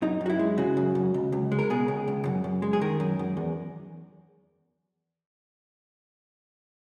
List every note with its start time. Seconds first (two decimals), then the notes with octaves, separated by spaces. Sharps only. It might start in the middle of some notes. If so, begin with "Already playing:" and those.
0.02 F#2 D#4
0.21 F#2
0.26 F#4
0.30 E4
0.39 G#3
0.58 C#3 F#4
0.77 F#2
0.95 F#2
1.14 C#2
1.32 C#2
1.52 G#3
1.59 A#4
1.70 B2 G#4
1.88 C#2
2.08 C#2
2.25 F#2
2.44 F#2
2.62 G#3
2.73 G#4
2.81 D#3 A#4
3.00 F#2
3.19 F#2
3.37 E2